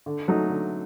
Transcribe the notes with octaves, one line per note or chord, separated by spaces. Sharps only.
D3
F#3 A3 D#4
D3